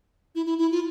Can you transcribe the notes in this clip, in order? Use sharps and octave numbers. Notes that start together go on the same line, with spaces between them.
E4
E4
E4
F4